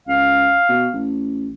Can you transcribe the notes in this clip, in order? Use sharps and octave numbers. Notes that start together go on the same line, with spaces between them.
C#2 F5
B2
A1